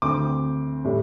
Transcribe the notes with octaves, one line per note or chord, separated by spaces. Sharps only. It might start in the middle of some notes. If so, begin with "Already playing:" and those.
D2 D3 C4 D6
A2 G3